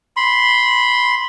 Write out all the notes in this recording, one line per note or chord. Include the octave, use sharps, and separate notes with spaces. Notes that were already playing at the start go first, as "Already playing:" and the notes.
B5 C6